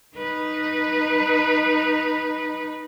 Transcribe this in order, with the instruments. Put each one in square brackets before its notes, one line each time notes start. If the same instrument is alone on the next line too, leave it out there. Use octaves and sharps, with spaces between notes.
[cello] D#4 B4